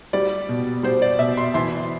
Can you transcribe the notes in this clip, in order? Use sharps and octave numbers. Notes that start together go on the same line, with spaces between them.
G3 D5
B2
G3 C5
D5
B2 E5
C6
E3 C6